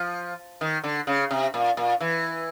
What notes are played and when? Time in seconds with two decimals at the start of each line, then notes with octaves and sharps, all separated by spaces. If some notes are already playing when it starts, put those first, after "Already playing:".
Already playing: F3
0.61 D#3
0.84 D3
1.07 C#3
1.31 C3
1.54 A#2
1.77 A#2
2.01 E3